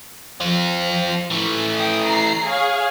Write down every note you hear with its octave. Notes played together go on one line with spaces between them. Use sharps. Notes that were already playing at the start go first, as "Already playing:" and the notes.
F3 C4 F4
E3 A3
G5 D#6
A#5 C7
G#4 C#5 F5